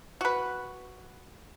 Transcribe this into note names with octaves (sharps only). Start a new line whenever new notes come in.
F#4 B4